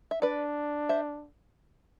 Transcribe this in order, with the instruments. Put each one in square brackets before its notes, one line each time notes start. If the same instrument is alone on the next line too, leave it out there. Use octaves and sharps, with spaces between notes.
[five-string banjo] E5
[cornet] D4 [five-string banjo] B4 D5
[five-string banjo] C5 E5